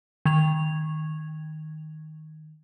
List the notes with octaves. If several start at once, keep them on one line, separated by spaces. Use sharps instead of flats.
D#3 G#6 F7